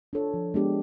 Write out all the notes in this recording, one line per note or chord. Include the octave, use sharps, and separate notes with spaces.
D4 F4 A4 C#5
F3
G#3 B3 D4 G4